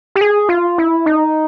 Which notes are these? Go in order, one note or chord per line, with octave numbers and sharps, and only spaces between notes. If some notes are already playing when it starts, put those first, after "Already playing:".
G4
G#4
F4
E4
D#4